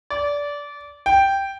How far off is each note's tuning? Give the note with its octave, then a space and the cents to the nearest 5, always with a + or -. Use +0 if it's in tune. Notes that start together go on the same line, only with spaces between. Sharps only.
D5 -20
G5 +0